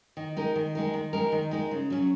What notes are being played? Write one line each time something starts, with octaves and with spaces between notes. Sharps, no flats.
D#3
G#3 D#4 A#4
D#3
G#3 D#4 A#4
D#3
G#3 D#4 A#4
D#3
G#3 D#4 A#4
C#3
F#3 C#4